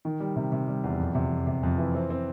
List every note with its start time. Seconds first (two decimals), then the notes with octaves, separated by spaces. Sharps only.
0.05 D#3
0.20 G3
0.36 C3
0.52 C3
0.68 G3
0.84 E2
1.00 F2
1.15 C3
1.32 F2
1.47 C3
1.63 F2
1.78 E3
1.95 C4
2.10 C4